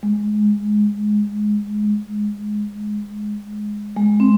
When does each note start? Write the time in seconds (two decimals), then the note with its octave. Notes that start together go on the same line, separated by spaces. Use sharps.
0.03 G#3
1.84 G#3
3.96 G#3
4.20 C4